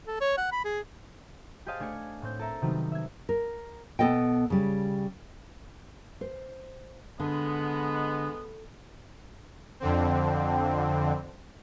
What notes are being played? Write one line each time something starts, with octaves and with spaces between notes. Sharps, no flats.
A4
C#5
F#5
B5
G#4
G4 G#4 C5 D#5 F5 A5
A3 D4 G#5 G#6 C#7
A2 C4 G6
A4 A#4 E5 A#5
C3 D#3 F#3 G3 B3
E5 G#6
A#4
B2 B3 A4 D#5 G5
C#3 G3
C5
D3 G#3 B3
F2 D3 C4